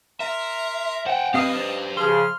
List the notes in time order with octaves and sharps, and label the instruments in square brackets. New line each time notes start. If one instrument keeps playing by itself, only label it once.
[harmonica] A#4 A#5 C6 [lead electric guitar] E5
[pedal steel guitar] C5 [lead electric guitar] F#5 G5
[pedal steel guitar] C4 F5 D#6 [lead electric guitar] G4 B4 [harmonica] D#5
[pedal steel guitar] C5 D5
[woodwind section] C#3 F3 G#4 [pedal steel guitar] C6 [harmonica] F6